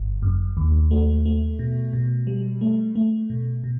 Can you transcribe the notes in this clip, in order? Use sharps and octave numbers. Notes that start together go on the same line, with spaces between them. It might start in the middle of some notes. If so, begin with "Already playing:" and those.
Already playing: G1
F#2
D#2
A3
A3
B2
B2
G3
A3
A3
B2
B2